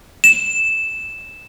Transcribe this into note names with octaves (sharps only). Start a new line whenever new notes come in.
E7